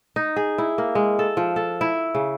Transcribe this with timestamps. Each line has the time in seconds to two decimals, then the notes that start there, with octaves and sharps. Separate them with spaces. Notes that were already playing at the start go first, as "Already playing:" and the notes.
0.16 D#4
0.36 G#4
0.58 E4
0.78 A#3
0.95 G#3
1.19 A4
1.37 F3
1.56 A4
1.81 E4
2.15 C#3